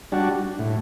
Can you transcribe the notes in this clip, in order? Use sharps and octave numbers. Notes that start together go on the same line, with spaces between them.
G3 D4 F#4
A2